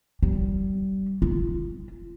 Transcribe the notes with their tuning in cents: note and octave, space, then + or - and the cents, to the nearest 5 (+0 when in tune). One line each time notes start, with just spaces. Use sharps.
G3 -30
F4 -35